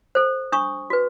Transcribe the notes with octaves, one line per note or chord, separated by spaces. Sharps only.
A4 C5
D4 C#6 D#6
F#4 B4